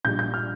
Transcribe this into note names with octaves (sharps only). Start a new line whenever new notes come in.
A#1 A#2 G3 G6
G6
F6